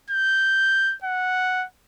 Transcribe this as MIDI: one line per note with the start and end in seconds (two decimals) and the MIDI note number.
0.10 0.94 91
1.04 1.65 78